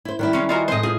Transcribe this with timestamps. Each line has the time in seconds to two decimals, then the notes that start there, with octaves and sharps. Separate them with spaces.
0.05 E4 C5
0.19 D#3 G3 E4 B4
0.33 G#3 C#4
0.49 F4 F#4 A#4 D#5 G#5
0.68 A2 G#3 C5 D#5
0.83 F4 G#4